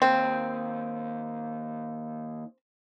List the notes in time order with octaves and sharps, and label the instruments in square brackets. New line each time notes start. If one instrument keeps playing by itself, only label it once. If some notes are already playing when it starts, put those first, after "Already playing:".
[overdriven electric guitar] D#2 [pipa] C4